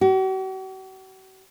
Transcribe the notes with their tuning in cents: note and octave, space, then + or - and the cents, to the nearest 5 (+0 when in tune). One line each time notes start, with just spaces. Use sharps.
F#4 +45